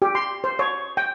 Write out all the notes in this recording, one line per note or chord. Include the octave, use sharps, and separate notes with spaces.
G4
C6
C5
C#5
G5